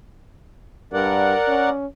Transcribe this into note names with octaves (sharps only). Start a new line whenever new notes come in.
G2 A#4 D5 F#5
C#4